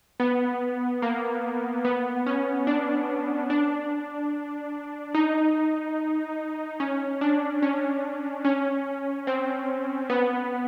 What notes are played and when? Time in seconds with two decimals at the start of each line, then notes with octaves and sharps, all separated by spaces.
0.20 B3
1.02 A#3
1.85 B3
2.26 C#4
2.67 D4
3.50 D4
5.15 D#4
6.80 C#4
7.21 D4
7.62 C#4
8.45 C#4
9.27 C4
10.10 B3